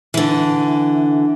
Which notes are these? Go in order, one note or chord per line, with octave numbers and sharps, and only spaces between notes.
D3 E3